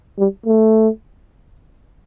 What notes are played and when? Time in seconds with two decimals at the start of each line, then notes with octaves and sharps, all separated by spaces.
0.18 G3
0.46 A3